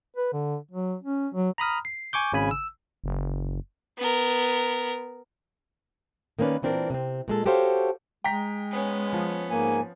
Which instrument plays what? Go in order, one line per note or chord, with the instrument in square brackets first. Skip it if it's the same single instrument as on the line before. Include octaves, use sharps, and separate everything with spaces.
[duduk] B4
D3
F#3
C#4
F#3
[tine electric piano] A#5 B5 D#6 F6
C7
G#5 C#6 D6 G6
G#1 C#3 G#5 B5
E6
[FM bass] F#1
[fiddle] B3 A#4
[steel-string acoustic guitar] D#3 A#3 B3 C#4 B4 D5
A#2 E3 C4 D4 A#4
C3 C4
A#2 G#3 A4
F#4 G4 A4 C5 C#5 F5
[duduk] G#3 [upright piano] G5 A#5 B6
[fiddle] B3 C#4
[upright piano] F3
[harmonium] G#2 A#3 G#5